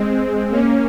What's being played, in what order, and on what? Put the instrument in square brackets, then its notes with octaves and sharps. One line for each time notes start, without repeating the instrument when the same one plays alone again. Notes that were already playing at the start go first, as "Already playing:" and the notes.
Already playing: [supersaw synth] G#3 C4
A#3 C#4